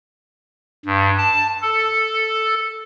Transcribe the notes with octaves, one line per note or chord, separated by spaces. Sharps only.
G2
A5
A4